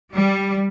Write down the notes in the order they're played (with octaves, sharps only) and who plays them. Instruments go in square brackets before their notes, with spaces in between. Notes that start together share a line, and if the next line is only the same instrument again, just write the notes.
[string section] G3